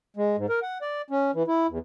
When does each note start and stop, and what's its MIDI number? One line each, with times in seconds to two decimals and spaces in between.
0.17 0.36 56
0.37 0.46 44
0.49 0.60 70
0.62 0.78 78
0.82 1.02 74
1.10 1.31 61
1.34 1.43 52
1.47 1.67 64
1.69 1.79 40